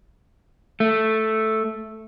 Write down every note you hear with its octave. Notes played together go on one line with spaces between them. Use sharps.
A3